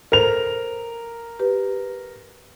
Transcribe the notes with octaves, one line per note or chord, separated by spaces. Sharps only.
A4 A#4 C5 F7
G4 B4